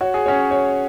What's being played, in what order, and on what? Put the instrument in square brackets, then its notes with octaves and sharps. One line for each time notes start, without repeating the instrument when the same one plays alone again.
[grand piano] F#4 [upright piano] C#5
[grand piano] G#4
[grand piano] C#4 F#4 [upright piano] C#5
[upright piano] C#5